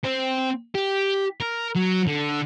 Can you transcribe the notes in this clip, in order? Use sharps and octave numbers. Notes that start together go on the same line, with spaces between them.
C4
G4
A#4
F#3
D3